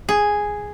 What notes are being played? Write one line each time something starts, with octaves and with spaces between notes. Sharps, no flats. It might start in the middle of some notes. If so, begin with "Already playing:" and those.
G#4